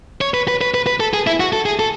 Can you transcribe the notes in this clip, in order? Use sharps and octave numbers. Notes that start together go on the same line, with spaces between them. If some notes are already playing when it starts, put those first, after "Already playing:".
C#5
B4
B4
B4
B4
B4
A4
G#4
E4
F#4
A4
G#4
A4